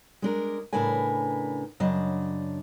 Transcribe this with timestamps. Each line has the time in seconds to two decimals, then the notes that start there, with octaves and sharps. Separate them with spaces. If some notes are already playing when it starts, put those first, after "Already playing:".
0.22 G#3 D4 A#4
0.73 A2 C#3 D4 A#4 B4 G#5
1.80 F#2 C#3 D4 D#5